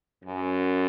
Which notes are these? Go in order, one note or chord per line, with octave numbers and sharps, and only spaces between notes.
F#2